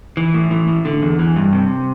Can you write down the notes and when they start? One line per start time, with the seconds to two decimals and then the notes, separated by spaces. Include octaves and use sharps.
0.17 E3
0.34 A2
0.51 E3
0.68 A2
0.85 D3
1.02 E2
1.19 E3
1.36 G2
1.53 C3